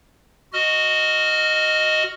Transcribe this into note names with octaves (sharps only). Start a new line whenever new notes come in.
F#4 D#5 F6